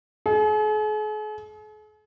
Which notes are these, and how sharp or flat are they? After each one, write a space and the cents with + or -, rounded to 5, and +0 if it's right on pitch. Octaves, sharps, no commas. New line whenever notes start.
G#4 +45